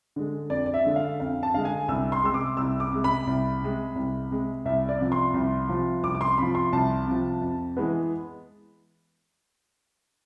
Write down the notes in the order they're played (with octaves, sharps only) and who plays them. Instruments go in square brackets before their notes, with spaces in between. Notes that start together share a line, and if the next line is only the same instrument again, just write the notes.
[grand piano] D3 G#3
F2 D5
D5
E5
D3 G#3
F5
F2 F5
A5
D3 G#3 F5
G#5
C2 E6
C6
C3 G#3 E6
D6
C2 E6
D6
C3 G#3
B5
C2
C3 G#3
C2
C3 G#3
C2 E5
D5
C3 F3
C6
C2
C3 F3
C2 D6
D6
C6
C3 F3 B5
C6
C2 A5
C3 F3
F2
E3 G#3 B3